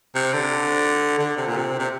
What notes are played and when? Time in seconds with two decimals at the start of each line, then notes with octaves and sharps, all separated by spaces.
0.15 C3
0.33 D3
1.19 D3
1.37 C3
1.47 A#2
1.57 C3
1.79 C3